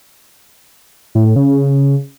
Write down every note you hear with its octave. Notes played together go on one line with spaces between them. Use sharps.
A2
A2
C#3